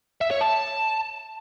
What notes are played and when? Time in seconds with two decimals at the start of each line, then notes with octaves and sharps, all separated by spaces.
0.21 E5
0.31 C#5
0.41 A5